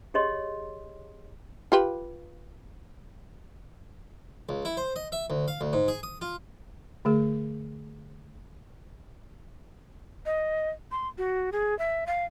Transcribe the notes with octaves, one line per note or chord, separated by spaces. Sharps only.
G4 G#4 C#5 D#5 C6
F4 G4 B4
C#2
E4
C5
D#5
E5
D2
F5
D2
G#2
G#4
D#6
F4
D3 A3 G#4
D#5
C6
F#4
G#4
E5
F5